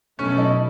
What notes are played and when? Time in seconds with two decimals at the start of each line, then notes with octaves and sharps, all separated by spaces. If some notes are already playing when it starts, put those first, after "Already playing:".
0.19 B2 F#3 A3 C#4 E4 A4
0.37 D#4